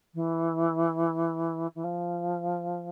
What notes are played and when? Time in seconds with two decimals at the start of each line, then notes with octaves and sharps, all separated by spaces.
0.14 E3
1.75 E3
1.84 F3